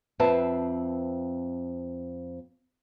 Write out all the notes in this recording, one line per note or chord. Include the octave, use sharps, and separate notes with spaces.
F2 C4 B4 E5 A5